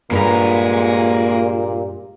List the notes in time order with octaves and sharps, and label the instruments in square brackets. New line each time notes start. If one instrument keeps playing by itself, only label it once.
[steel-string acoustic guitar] G2 G3 A#5 [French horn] A#2 [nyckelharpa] G#3 G#4 [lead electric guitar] A#3 B4